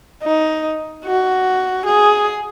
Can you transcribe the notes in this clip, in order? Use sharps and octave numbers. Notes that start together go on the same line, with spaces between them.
D#4
F#4
G#4